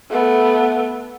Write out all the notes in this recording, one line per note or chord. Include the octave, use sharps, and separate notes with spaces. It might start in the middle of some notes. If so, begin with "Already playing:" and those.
A3 B3